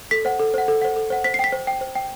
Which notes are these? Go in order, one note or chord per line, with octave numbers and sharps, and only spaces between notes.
A4 B6
C5 F#5
A4
C5 F#5
A4
C5 F#5
A4
C5 F#5
C5 B6
C7
G5 B6
C5
G5
C5
G5